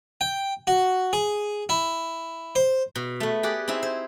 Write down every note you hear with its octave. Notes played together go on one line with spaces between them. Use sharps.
G5
F#4
G#4
E4
C5
B2
A3 B3
G4 G#4 D5 F#5
C4 D#4 E4 G#5
C5